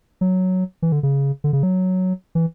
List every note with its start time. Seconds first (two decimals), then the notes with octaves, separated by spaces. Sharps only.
0.21 F#3
0.82 E3
0.92 D3
1.03 C#3
1.44 D3
1.53 C#3
1.63 F#3
2.35 E3